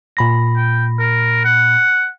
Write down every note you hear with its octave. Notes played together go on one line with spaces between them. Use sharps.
A#2 B5 A#6
G5
A#4
F#5